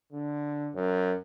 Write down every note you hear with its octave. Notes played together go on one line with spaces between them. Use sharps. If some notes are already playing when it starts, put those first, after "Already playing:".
D3
F#2